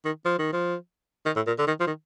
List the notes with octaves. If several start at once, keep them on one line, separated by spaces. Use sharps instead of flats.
D#3
F3
D#3
F3
D#3
A2
A#2
D3
D#3
F3
D#3